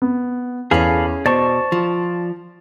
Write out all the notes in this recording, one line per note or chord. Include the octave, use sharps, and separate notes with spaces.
B3
E2 C#4 G#4 A4 F5 B5
B2 C5 D5 A5 C#6
F3